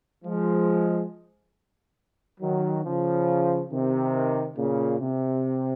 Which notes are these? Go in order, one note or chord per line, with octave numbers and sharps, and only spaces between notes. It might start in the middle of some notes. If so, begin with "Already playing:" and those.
F3 G#3
D#3 F#3
C#3 F3
C3 D#3
A#2 C#3
C3